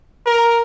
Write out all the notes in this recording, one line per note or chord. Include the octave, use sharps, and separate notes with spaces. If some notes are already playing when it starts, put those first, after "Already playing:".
A#4